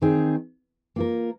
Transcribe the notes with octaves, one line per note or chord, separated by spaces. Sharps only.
D#3 C4 D#4 G#4
A#3 F4 A#4